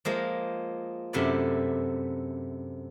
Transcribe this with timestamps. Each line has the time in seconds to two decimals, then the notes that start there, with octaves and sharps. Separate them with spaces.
0.05 F3 G#3 A#3
1.13 F#2 C3 A3 E4 D5